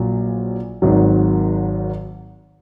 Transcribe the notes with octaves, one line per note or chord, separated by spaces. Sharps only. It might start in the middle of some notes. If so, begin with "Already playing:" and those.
Already playing: A#1 A#2 F#3
G#1 G#2 D#3 F#3